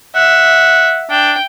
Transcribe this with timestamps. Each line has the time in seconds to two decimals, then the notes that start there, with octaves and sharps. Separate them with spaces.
0.15 E5 F#5
1.11 D4 G5